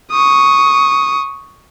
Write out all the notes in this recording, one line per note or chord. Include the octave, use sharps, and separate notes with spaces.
C#6 D#6